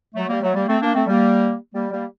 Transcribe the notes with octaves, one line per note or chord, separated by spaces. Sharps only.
F#3 A3
G3 A#3
F#3 A3
G3 A#3
A3 C4
A#3 D4
A3 C4
G3 A#3
G3 A#3
G3 A#3